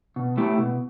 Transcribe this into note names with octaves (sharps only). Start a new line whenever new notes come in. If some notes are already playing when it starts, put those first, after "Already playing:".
B2
A3 E4 G4
B2